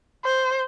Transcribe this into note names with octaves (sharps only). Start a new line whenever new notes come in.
C5